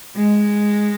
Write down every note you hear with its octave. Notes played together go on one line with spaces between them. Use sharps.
G#3